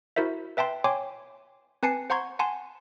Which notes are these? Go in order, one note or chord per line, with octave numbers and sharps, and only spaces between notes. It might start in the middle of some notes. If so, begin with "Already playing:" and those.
E4 F#4 A#4 C5 E5
B4 E5 G5 A5 C6
C#5 G5 G#5 C6 D6
C4 B4 G#5 A5 C7 C#7
C5 F#5 A#5 C6 C#6 G#6
F#5 G#5 A5 C6